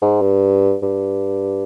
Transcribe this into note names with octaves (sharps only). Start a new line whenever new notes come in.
G#2
G2
G2